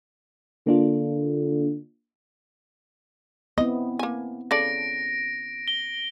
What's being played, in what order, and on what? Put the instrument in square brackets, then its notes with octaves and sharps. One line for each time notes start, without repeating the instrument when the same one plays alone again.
[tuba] D3 [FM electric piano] A#3 D4 F4
[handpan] B3 C4 E4 [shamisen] D#5
[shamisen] A#3 G#5
[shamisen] C#3 A4 D5 [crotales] A#6 D7
[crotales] G7